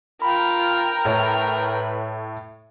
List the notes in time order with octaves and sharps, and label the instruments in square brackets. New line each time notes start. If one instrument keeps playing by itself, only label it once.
[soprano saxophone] F4 [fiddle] A#4 G5 [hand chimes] B5
[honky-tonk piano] A2 C#5 [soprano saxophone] B4